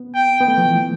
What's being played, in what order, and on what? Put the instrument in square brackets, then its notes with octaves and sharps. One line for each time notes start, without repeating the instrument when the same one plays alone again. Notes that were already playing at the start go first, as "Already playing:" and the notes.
Already playing: [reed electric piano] B3
[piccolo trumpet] G5
[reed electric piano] B3
[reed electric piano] A3 [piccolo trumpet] G5
[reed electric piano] F3
E3